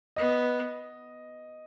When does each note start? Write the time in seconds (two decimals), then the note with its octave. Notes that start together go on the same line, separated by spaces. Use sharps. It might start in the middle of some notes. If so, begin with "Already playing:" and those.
0.16 B3 D#5